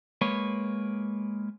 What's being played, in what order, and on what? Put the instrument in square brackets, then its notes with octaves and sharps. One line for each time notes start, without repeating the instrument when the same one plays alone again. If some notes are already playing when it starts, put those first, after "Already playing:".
[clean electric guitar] G#3 A#3 B4 C#5